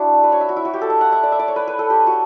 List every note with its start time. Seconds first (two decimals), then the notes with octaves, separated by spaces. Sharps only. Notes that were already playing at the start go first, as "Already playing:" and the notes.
Already playing: D4 E4 F#4
0.24 B4
0.32 C#5
0.41 E5
0.49 F#4
0.56 E4
0.65 F#4
0.74 G4
0.81 A4
0.90 E5
1.01 F#5
1.12 E5
1.23 D5
1.32 E5
1.39 D5
1.48 C#5
1.56 B4
1.68 B4
1.79 A4
1.90 G4
2.07 F#4